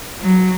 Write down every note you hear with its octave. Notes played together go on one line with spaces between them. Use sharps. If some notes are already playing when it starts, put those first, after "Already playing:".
F#3